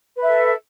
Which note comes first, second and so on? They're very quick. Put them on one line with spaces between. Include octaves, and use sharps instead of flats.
B4 E5 A4